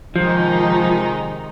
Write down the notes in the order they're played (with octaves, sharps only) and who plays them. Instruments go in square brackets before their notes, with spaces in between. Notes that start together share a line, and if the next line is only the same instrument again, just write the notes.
[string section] C3 D#3 G#3 D#4 [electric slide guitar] F3